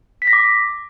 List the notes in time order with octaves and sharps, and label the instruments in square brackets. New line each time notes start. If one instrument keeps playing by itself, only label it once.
[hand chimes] B6
A#6
D6